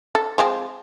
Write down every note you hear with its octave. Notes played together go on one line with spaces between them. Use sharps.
A4
F3 G#3 C4